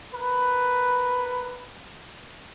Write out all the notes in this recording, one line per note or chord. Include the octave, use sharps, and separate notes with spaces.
A#4 B4